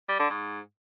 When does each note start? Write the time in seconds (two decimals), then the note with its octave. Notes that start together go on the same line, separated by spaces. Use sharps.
0.09 G3
0.19 D3
0.30 G#2